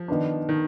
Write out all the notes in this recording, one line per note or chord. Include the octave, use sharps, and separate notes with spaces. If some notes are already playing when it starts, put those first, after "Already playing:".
Already playing: F3
D#3 B3 D4
D#3